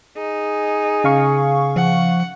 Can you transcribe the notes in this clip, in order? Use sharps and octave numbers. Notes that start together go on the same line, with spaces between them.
D#4 G#4
C#3 F5 C#6
F3 F#5